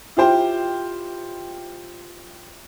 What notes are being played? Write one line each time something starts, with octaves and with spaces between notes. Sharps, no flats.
E4 F4 G4 C5 G5